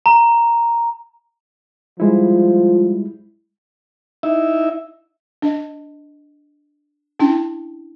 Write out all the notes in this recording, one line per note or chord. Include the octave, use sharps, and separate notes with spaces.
A#5
F3 G3 G#3 E4
D#4 E4 E5
D4 D#5
C#4 D4 E4 G5